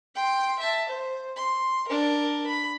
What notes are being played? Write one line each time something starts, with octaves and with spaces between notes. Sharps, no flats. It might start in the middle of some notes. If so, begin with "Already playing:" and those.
G5 C6
E5 A5
C5
C6
D4 A#4
B5